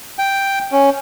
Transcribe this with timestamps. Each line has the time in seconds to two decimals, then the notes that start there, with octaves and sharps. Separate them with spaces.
0.19 G5
0.72 C#4